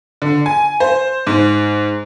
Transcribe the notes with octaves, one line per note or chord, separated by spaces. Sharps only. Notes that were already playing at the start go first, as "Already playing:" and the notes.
D3
G#5
C5
G#2